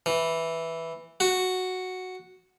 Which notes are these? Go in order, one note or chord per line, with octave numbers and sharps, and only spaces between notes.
E3
F#4